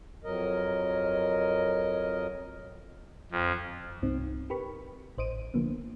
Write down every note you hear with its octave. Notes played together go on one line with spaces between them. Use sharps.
F2 F#3 A#4 D#5
F2
C2 G2 C4 D#4
G4 A#4 B4 B5 C#6
A1 C5 D#5 D7 D#7
D3 F3 A#3 B3